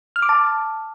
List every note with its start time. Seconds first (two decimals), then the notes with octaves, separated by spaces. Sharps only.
0.16 F6
0.22 D6
0.29 A5